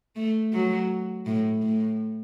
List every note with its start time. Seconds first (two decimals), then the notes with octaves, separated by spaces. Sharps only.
0.16 A3
0.53 F#3
1.26 A2
1.62 A2